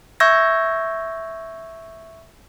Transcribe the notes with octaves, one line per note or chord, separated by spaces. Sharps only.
E5 C#6 E6 G6 G#6 A#6